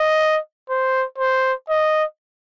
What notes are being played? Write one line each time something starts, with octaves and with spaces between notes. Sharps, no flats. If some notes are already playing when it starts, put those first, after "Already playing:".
Already playing: D#5
C5
C5
D#5